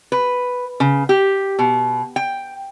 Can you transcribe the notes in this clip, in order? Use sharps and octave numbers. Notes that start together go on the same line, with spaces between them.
B4
C#3
G4
B2
G5